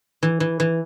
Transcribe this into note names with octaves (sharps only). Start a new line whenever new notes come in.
E3
E3
E3